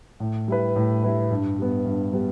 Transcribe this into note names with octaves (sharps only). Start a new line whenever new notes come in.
A2
G3 E4 B4
A2
G3 E4 B4
G2
G3 B3
G2
G3 B3